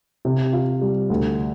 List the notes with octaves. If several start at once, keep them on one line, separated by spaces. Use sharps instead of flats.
C3
F4
G3
D2